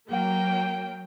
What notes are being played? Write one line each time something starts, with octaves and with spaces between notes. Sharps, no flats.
F#3 A#3 G5